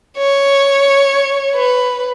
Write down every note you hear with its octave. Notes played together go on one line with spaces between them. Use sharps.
C#5
B4